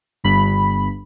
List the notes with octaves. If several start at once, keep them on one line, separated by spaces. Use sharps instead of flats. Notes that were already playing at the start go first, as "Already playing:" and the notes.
G1 G2 B5